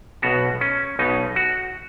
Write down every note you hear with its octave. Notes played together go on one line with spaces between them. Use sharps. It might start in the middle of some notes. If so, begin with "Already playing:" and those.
B1 B2 B3 F#4
C#4
B1 B2 B3 D#4
F#4